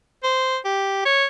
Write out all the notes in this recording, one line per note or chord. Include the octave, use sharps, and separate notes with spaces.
C5
G4
C#5